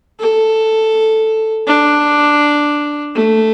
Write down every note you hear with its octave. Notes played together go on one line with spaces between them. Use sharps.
A4
D4
A3